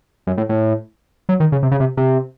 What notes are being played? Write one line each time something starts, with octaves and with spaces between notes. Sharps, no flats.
F#2
A2
A2
F#3
D#3
C#3
C3
C#3
C3
C3